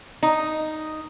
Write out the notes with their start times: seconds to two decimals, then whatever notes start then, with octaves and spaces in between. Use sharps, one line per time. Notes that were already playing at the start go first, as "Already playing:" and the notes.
0.23 D#4